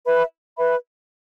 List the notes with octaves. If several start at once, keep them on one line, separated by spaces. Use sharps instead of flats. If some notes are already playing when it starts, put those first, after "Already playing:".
B4 E5 B5
B4 E5 B5